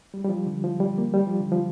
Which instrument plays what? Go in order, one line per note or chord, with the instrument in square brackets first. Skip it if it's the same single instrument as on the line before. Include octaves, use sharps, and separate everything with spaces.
[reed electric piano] G3
G3
F3
D3
F3
G3
A#3
G3
F3
D3
F3